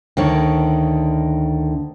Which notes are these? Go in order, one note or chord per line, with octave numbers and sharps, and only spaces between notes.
D2 D3 D#3 C#5